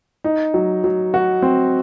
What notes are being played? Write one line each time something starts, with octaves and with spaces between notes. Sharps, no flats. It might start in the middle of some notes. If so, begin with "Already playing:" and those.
D#4
F#3
F#3
F#4
C4